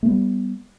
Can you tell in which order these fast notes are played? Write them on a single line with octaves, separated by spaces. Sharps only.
A3 B3 G3